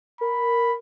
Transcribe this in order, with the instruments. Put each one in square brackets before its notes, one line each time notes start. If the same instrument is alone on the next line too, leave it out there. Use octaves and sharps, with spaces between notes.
[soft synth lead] A#4 [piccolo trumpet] B5